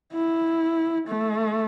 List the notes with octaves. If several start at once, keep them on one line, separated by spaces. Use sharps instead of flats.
E4
A3